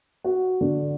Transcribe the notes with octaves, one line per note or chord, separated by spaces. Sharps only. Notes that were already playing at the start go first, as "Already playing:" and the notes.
F#4
D3